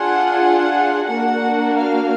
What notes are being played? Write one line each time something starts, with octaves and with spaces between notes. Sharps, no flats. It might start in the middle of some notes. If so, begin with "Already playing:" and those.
Already playing: D4 F4 G#4 F#5
A#3 D4 F#4 F#5
F5